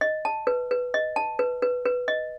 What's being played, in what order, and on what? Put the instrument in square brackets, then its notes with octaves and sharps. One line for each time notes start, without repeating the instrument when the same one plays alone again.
[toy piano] D#5
A5
B4
B4
D#5
A5
B4
B4
B4
D#5